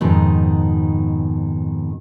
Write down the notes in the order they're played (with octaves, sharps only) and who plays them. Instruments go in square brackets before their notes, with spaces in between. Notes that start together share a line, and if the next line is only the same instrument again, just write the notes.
[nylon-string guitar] F2 G#2 B2 D#3